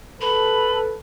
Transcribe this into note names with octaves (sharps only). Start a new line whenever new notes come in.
A4 B4 B5